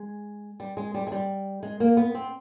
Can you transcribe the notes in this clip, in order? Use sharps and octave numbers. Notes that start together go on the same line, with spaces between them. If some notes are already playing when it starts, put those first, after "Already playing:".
Already playing: G#3
G3
G#3
G3
G#3
G3
G#3
A#3
B3
C4